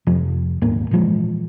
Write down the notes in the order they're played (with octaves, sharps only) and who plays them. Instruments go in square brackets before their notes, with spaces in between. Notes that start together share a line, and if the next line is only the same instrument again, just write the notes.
[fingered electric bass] F2 C3 F3
D#1 G#2 A#3
A#2 E3 F3 G#3